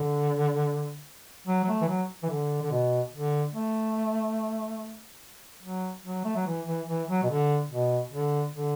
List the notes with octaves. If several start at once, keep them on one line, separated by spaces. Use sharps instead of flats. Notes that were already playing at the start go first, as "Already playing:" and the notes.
Already playing: D3
F#3
F#3
A3
E3
F#3
E3
D3
D3
B2
D3
A3
F#3
F#3
A3
F#3
E3
E3
E3
F#3
B2
D3
B2
D3
D3